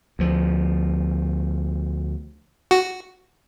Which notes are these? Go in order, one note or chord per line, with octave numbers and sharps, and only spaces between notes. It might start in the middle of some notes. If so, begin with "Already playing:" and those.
D2 F3
F#4